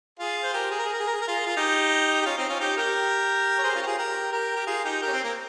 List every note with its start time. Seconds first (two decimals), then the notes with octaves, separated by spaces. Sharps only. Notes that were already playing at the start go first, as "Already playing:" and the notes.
0.19 F4 G#4
0.43 C5
0.53 G4 A#4
0.71 G#4
0.78 A#4
0.85 G#4
0.93 A#4
0.99 G#4
1.07 A#4
1.13 G#4
1.21 A#4
1.28 F4 G#4
1.46 F4
1.57 D#4 G4
2.22 G4
2.26 C#4 F4
2.37 C4 D#4
2.49 C#4 F4
2.60 D#4 G4
2.77 G4 A#4
3.58 C#5
3.63 G#4 C5
3.70 G4
3.75 C#4 F4
3.82 G4
3.86 F4 G#4
3.98 G4 A#4
4.32 G4 A#4
4.56 G4
4.66 F4 G#4
4.84 D#4 G4
5.02 G4 A#4
5.08 C#4
5.13 C4
5.24 A#3